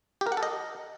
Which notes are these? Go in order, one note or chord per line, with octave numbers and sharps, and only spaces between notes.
G4
A#4
F#5
A4
D#5